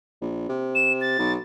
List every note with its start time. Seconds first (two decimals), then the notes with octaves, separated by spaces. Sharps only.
0.21 A#1
0.49 C3
0.75 E7
1.01 A6
1.19 B1